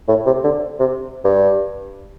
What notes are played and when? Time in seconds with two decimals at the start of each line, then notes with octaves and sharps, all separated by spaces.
0.08 A2
0.26 C3
0.44 D3
0.80 C3
1.24 G2